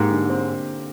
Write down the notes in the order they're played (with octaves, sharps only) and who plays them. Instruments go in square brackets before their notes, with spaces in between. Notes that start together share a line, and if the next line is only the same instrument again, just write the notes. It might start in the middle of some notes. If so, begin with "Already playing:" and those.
Already playing: [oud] G#2 [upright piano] A#3 G4
[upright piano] D3
C4